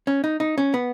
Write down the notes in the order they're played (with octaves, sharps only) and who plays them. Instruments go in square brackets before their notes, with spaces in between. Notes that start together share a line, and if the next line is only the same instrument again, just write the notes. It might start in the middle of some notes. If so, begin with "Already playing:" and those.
[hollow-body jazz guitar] C#4
D#4
D#4
C#4
B3